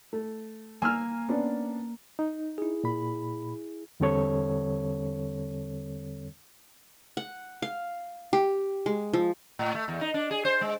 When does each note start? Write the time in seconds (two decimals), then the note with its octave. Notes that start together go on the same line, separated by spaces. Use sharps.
0.13 A3
0.82 A#3 G#5 E6 F6
1.29 B3 C#4 D4
2.19 D#4
2.58 E4 G#4
2.84 A#2 B5
4.00 E2 D3 G3 C4 A4 C#5
7.17 F#5
7.62 F5
8.33 G4
8.86 G#3
9.13 F3
9.59 A2
9.75 A3
9.88 E2
10.01 D#4
10.14 D4
10.31 G#4
10.45 C5
10.61 G#3